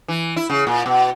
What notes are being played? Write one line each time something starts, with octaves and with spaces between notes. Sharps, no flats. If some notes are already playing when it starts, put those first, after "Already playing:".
E3
E4
C#3
A#2
B2